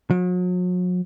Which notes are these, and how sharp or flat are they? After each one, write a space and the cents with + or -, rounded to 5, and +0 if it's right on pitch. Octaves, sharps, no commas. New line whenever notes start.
F#3 -40